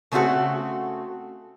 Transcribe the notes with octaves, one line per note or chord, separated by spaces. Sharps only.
C#3 A3 C4 F4 F#4 A4